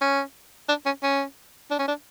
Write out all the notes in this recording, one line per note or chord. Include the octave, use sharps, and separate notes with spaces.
C#4
D4
C#4
C#4
D4
C#4
D4